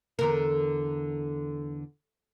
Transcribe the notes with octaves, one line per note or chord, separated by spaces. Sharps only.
E2 D3 A#4